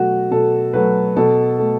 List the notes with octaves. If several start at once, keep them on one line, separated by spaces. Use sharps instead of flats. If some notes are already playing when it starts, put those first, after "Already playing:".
Already playing: B2 F#3 A3 F#4
B2 A4
F#3 A3 B4
B2 A4
A3